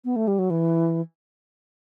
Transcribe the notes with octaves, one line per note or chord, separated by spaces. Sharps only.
B3
A3
G3
F#3
E3